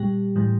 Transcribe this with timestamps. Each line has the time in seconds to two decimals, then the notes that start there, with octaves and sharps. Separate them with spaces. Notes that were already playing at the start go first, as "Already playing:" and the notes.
Already playing: A#2 G3 G4
0.36 A2 E3 G3